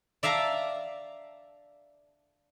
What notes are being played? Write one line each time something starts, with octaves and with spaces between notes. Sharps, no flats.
D5 E5 F5 A5 A#5